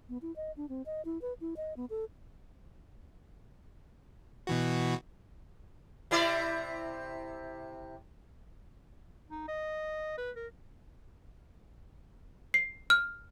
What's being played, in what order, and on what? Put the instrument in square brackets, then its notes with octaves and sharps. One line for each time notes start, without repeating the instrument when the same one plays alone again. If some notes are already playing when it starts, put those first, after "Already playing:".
[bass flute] B3
E4
D#5
D4
C4
D#5
E4
B4
E4
D#5
B3
A4
[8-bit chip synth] B2 E3 F#4
[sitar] C3 E4 D5
[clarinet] D#4
D#5
B4
A#4
[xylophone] C7
F6